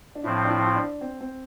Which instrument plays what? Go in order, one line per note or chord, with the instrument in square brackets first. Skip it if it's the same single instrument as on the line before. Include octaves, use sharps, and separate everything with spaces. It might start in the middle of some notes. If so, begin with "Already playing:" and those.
[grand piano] D4
[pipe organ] A2 F3 C4 [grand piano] E4
[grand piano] D4
E4
E4
D4
C4
C4